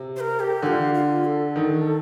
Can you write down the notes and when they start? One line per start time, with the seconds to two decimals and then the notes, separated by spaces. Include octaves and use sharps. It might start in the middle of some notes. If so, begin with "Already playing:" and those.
Already playing: C3
0.16 C5
0.20 A#4
0.40 G4
0.62 D3 G4
0.66 F4
0.94 F4
1.25 A4
1.56 D#3